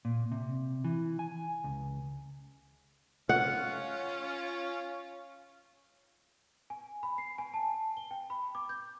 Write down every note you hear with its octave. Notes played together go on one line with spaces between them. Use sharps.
A#2
C3
E3
G#5
C#2
C#4 F4 F#5
G#5
B5
C7
G#5
A5
G7
G5
B5
D6
G6